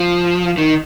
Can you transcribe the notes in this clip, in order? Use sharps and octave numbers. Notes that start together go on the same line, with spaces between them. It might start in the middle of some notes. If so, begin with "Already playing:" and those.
Already playing: F3
D#3